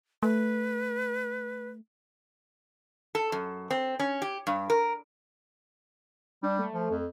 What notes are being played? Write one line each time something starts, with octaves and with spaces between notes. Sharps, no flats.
A3 B4
A4
F#2
C4
C#4
G4
G2
A#4
G3 D4
A3
F3
F2